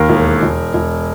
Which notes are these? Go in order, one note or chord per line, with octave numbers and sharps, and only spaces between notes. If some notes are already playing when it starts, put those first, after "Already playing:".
Already playing: D#2 A#4
E1
E1
E1